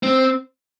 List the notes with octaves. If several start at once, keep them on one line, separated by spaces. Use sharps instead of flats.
C4